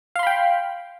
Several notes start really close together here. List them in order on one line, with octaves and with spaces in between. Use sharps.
F5 C6 B5 G5